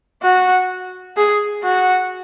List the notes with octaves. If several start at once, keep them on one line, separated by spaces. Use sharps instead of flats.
F#4
G#4
F#4